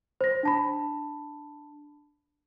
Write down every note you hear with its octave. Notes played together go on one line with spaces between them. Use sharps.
C5 A#6
D4 A5 B5